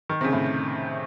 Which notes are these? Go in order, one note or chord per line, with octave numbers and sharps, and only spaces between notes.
D#3
C3
C#3
A2